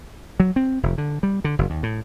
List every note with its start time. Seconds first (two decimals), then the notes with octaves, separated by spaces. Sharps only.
0.40 F#3
0.56 C4
0.83 F1
0.98 D3
1.23 G3
1.44 D3
1.59 F#1
1.70 D#2
1.83 A2